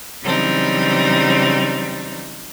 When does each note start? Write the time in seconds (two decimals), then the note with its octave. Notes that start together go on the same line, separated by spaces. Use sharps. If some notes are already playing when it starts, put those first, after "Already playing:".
0.22 C#3 E3 F#3 G3 C4 D#4